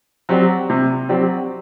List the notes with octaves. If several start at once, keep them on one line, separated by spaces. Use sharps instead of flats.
F#3 C4 G4 D5
C3
F#3 C4 G4 D5